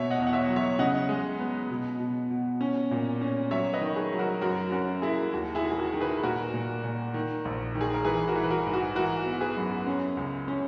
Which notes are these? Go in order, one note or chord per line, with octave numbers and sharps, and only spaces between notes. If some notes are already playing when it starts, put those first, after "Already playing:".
Already playing: B2 C#5 E5
D#5 F#5
E2
F#5
C#5 E5
F#3
C#5 E5
C#3 D#5 F#5
G#3
B3
B2
B2
B2
C#4
A#2
C#4
F#3 C#5 E5
B4 D#5
D#3
G#4 B4
F#3
F#4 A#4
F#2 F#4 A#4
C#4 F#4 A#4
A#3 E4 G#4
D#2 F#4
E4 G#4
D#3
G#4
F#4 A#4
D#3
G#4 B4
A#2 F#4 A#4
A#2
A#2
D#3
A#1
D#3
G#4
A#4
E3 G#4 B4
F#4 A#4
E3
B4
F#4 A#4
G#2
F#4
E3 F#4 A#4
B3
G#4 B4
F#2
C#4
C#2
C#4